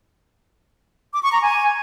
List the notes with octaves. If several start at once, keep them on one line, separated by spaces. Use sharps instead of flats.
D6
C#6
A#5
G#5